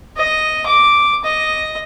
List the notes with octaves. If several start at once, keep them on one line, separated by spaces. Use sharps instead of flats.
D#5
D6
D#5